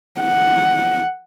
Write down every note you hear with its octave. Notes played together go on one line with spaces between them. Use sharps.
F#5